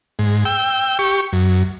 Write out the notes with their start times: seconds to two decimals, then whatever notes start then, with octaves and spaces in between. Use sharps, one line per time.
0.19 G#2
0.45 G5 E6
0.99 G4 C#6
1.33 F#2